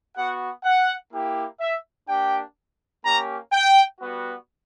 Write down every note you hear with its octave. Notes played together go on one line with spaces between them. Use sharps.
B3 F#4 F#5
F#5
A#3 E4 G4
E5
A#3 D4 G4 G5
A#3 C#4 G4 A#5
G5
G3 B3 F#4